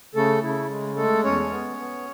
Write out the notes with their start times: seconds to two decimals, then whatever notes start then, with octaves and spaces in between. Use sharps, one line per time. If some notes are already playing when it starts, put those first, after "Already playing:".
0.15 C#3 A3 A4
0.43 C#3 E4
0.69 G#3
0.96 G#3 A3 A4
1.24 E2 C#4 C#5
1.50 B3
1.77 B3